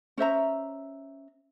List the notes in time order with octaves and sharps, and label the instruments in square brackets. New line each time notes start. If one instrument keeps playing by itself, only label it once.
[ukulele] C#4 C5 E5 A#5